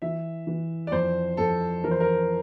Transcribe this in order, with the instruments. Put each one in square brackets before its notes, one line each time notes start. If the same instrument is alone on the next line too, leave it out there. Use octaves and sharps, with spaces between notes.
[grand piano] E3 E5
E3
D5
F2 C5
F2 A4
E3 A#4
C5
A#4